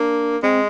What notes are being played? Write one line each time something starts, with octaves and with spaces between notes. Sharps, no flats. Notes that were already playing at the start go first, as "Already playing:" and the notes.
Already playing: A#3 D4
G#3 C4